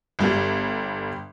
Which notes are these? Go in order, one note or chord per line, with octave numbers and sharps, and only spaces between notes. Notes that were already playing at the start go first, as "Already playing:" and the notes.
G1 G3